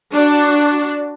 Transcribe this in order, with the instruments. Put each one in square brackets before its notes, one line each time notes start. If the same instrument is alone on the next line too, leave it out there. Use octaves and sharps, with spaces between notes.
[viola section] D4 F#4